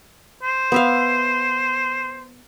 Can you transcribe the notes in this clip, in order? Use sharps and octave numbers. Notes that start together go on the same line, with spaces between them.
C5
B3 E5 F5